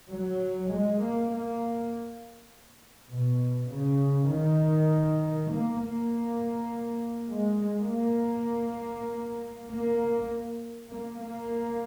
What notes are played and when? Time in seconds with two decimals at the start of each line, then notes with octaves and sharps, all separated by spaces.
0.12 F#3
0.73 G#3
1.03 A#3
1.32 A#3
3.12 B2
3.72 C#3
4.32 D#3
5.51 A#3
5.81 A#3
7.31 G#3
7.61 G#3
7.92 A#3
9.71 A#3
10.91 A#3
11.20 A#3